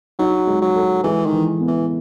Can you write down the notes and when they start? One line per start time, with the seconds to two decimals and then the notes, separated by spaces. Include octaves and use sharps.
0.19 F#3 D#4
0.47 G#3
0.62 F#3
0.76 A4
1.04 E3 G#3
1.26 D#3
1.32 E3
1.60 B3
1.67 E3